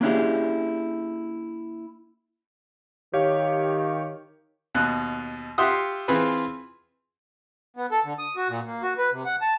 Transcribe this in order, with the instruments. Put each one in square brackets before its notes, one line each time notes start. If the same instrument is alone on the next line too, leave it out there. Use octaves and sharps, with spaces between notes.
[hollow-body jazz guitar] A#3 C#4 D4 E4 G4 G#4
[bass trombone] D#3 [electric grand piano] G4 C#5 F5
[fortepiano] D#2 B2 F#6
F4 G4 E5 F#5 C6 D#6
E3 C4 F4 G#4 B4
[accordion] B3
A4
D3
D#6
F#4
A#2
A#3
F#4
B4
C3
F#5
A5